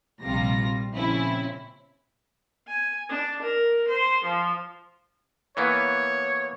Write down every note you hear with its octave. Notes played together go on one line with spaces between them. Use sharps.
A#1 C3 G3 F4 A#6
A#1 C#3 C4 C#4 E4
G#5
D4
A#4
C5
F3
E3 A#3 B3 C#5